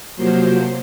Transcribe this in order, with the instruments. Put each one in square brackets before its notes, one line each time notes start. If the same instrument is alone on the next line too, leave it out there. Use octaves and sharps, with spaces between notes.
[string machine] C3 F3 F#3 A#3 C5